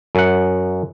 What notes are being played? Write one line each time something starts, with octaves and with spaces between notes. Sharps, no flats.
F#2 F#5